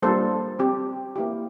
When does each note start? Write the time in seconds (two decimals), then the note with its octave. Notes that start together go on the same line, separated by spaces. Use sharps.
0.02 G3 A#3 D4 F4 A4 C5
0.59 C4 G4
1.16 A#3 E4 G4